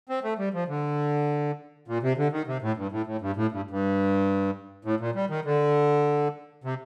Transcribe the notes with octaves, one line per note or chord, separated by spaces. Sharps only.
C4
A3
G3
F3
D3
A#2
C3
D3
D#3
C3
A2
G2
A2
A2
G2
A2
G2
G2
A2
A#2
G3
D#3
D3
C3